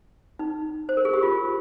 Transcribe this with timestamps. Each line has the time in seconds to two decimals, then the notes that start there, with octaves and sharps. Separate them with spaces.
0.39 D#4
0.89 C5
0.97 A#4
1.05 G#4
1.14 G4
1.23 F4